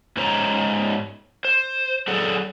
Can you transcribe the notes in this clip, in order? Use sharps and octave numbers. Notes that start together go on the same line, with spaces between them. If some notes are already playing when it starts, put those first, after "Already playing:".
G#2 C#4 C5 C#5 A#5
C5
F#3 G#4 A4 D5 F#5